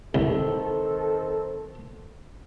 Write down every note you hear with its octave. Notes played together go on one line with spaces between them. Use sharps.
C2 D#3 C4 A4